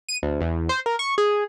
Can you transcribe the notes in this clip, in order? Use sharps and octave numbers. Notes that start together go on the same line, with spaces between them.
D#7
D2
E2
C5
A#4
C#6
G#4